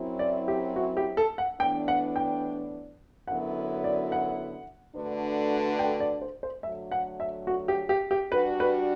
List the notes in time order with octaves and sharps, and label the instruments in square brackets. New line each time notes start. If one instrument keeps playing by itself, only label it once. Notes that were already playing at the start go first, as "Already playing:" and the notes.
Already playing: [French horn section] F#2 F#3 C4 E4
[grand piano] D5
G4
F#4
G4
A4
F#5
[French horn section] A2 E3 B3 D4 [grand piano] G5
[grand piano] F#5
G5
[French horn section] F#2 D3 F#3 B3 E4 [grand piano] F#5
[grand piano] D5
F#5
[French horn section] D3 A3 D4 F#4 B4
[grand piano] G5
D5
C5
C5
[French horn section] D3 F#3 A3 [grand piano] E5
[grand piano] F#5
E5
F#4
G4
G4
G4
[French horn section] G3 D4 F#4 [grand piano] B4
[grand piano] B4